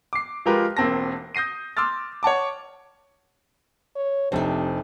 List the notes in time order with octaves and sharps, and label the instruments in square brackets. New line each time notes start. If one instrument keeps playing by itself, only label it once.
[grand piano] D6 C7
F3 G#3 F4 G4 A#4 B4
E1 A#3 C4 A5 A#6
D#6 G6 A#6 C7 D#7
C6 D6 E6 F6 A6
C#5 F#5 A5 D6
[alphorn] C#5
[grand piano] F1 C4 [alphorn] C3 [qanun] D4 D#4